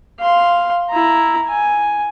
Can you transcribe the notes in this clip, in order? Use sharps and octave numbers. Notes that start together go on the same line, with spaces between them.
F5 C6
E4 A#5
G#5